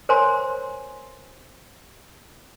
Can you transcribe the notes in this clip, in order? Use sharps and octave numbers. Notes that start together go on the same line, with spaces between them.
A#4 C5 C#5 G#5 A#5 C6